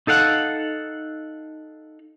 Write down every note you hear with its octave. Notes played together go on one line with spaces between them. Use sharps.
D#4 A4 F5 F#5